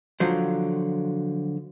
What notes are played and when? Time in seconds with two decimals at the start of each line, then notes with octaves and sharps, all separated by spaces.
0.20 D3 F3 F#3 C5